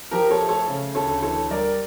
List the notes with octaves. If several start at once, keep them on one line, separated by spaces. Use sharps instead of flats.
F3 G4 A#4
A4 C#5
A3
A4 C#5
C#3
D2 A4 C#5
E3 A4 C#5
G3 A#4 D5